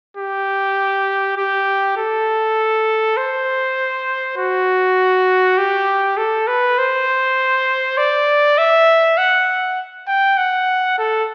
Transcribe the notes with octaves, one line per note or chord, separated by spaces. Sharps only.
G4
G4
A4
C5
F#4
G4
A4
B4
C5
D5
E5
F#5
G5
F#5
A4